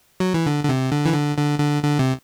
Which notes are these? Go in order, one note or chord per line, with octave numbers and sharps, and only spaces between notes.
F#3
E3
D3
D3
C3
D3
E3
D3
D3
D3
D3
C3